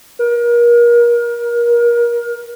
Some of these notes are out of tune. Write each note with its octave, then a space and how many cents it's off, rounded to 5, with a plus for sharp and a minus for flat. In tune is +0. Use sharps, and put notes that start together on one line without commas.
A#4 +30